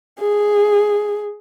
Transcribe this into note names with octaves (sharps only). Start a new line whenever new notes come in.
G#4